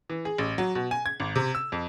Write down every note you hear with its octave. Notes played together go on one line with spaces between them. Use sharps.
E3
G#4
A1
F#3
B2
G#5
G#6
G#1
C3
E6
F2